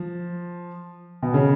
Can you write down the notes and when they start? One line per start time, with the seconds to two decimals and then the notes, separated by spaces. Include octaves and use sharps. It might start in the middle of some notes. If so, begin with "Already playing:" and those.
Already playing: F3
1.23 B2
1.34 C#3